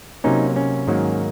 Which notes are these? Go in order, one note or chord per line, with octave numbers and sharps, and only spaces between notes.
C3 F#3 A#3 C#4 D#4
C#4
G#2 D#3 F#3 A#3